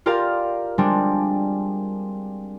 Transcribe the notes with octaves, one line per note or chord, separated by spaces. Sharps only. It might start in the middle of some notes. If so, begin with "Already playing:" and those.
F4 G4 A#4 D5 F5 A#5
G3 G#3 C4 D4